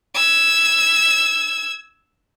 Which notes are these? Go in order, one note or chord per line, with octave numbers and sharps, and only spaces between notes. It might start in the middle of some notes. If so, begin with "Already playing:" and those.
E6 G#6